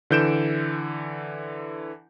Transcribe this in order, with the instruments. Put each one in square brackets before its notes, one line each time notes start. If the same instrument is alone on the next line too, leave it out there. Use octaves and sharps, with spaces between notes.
[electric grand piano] D3 E3 G6 D7 E7